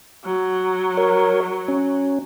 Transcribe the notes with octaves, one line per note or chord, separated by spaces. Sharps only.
F#3
A#4 C#5
C#4